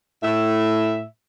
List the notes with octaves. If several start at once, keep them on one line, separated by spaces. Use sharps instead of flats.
A2 E5